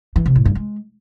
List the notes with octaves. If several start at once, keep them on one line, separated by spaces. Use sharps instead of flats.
E3
C3
A2
G2
G#3